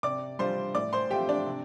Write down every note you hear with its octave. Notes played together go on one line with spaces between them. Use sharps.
C3 D5 D6
G3 D4 F4 C5 C6
A2 D5 D6
C5 C6
A3 C4 F4 G4 G5
D4 D5
C3